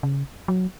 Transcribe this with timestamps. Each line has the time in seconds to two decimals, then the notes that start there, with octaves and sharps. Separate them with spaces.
0.03 C#3
0.48 F#3